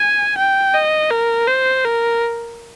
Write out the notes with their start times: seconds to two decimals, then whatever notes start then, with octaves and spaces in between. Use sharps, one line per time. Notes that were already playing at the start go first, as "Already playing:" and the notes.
Already playing: G#5
0.38 G5
0.74 D#5
1.11 A#4
1.48 C5
1.85 A#4